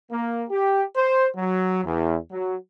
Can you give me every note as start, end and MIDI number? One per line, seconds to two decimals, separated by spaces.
0.12 0.44 58
0.50 0.84 67
0.96 1.28 72
1.37 1.84 54
1.85 2.17 40
2.31 2.56 54